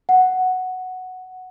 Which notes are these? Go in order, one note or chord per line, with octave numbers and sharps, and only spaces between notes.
F#5